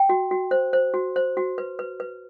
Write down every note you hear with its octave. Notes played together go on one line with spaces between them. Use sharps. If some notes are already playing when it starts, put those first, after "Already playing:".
Already playing: G5
F#4
F#4
C5
C5
F#4
C5
F#4
B4
B4
B4